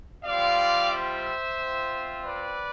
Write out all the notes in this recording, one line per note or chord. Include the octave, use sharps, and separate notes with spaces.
G3 C4 F4 D5 F5
C5 E5
C4 F4
B4 D5